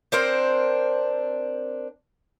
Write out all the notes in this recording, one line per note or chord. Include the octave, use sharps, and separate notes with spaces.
C4 D4 A#4 C5